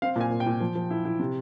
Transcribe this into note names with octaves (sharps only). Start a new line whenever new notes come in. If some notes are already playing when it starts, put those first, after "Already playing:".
C4 F5
A#2 G#5
A#2
G5
A#2
F3
F3
E4
E4
C3